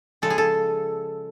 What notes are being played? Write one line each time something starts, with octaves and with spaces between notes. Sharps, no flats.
C#3 F3 G#3 A4
G#4
A4